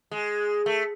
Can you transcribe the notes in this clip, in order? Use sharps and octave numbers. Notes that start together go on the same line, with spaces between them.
G#3
A3